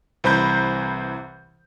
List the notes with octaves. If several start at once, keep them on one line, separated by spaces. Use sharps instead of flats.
C2 E3 C5 A#5 B5 G6